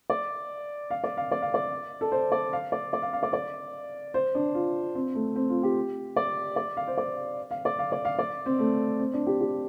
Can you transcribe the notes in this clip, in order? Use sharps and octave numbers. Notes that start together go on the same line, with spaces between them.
D5
F5
D5
F5
D5
F5
D5
A4
C5
D5
F5
D5
D5
F5
F5
D5
D5
C5
D4
F4
C4
A3
C4
F4
G4
D5
D5
F5
C5
D5
F5
D5
F5
D5
F5
D5
C4
A3
C4
D4
G4
G4